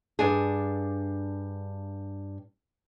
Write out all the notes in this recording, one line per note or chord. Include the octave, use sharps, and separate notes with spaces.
G2 D4 G#4